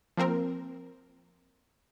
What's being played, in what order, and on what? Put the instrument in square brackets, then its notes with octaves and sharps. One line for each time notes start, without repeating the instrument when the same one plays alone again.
[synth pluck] F3 A#3 C4 A#4